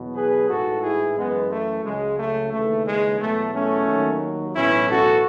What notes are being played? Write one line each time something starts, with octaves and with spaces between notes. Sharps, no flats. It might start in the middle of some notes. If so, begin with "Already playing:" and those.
Already playing: E2 B2 F#3
G#4 B4
A1 G#2 E3 F#4 A4
E4 G#4
F#2 E3 G#3 B3
A3
C#2 C#3 F#3 G#3
A3
D#2 C#3 E3 A3
G#3
E2 B2 F#3 A3
A3 C#4
D#2 D#3 F#3
B1 A2 E3 C#4 E4
F#4 A4